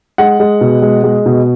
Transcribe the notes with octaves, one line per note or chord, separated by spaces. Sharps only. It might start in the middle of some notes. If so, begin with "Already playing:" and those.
G#3 F#5
G#3
B2
G#3
G#3
B2